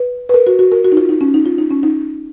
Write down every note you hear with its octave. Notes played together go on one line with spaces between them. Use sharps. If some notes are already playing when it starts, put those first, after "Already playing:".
Already playing: B4
B4
A#4
F#4
F#4
A#4
F#4
D#4
F4
D#4
C#4
D#4
F4
D#4
C#4
D#4